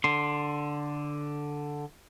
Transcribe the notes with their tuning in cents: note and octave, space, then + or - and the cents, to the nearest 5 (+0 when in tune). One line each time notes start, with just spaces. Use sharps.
D3 +0 C6 +5